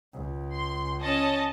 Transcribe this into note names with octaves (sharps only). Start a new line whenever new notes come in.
C#2
C6
C#4 D#5 A5